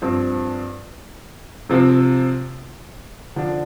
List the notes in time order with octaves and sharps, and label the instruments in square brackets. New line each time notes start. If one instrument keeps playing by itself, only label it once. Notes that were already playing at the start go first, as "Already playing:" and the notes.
[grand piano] G2 F3 C4
C3 F3 C4
D3 F3 D4